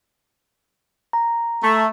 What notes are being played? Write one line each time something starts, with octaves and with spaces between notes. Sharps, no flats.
A#5
A3